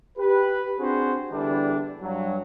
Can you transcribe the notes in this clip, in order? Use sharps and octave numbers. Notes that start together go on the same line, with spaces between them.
G4 B4
C4 D4 F#4 G#4 C5
E2 D3 E3 G3 D4
G2 F#3